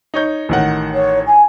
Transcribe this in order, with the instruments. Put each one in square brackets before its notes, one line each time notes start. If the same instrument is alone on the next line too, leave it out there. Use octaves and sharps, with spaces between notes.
[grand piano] D#4 C#5 G6
A1 D#3 F#5
[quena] C#5
G#5